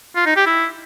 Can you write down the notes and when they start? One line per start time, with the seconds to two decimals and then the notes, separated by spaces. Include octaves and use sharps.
0.16 F4
0.26 D#4
0.36 G4
0.46 E4